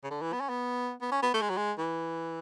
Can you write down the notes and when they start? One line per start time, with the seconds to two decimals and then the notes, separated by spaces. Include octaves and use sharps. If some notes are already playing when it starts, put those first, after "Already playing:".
0.04 C#3
0.10 D3
0.21 E3
0.33 B3
0.40 C#4
0.49 B3
1.02 B3
1.11 C#4
1.22 B3
1.34 A3
1.42 G#3
1.50 F#3
1.57 G#3
1.79 E3